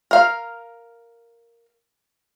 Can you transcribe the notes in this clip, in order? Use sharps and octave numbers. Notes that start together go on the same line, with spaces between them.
A#4 F5